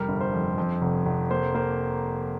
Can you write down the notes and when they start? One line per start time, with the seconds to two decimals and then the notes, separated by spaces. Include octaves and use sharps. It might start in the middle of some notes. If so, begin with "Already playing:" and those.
Already playing: F1 G3 A#4
0.08 G1
0.21 C5
0.33 F2
0.58 F2
0.81 F1
1.06 F1
1.30 A#3 C5
1.54 A#3 C5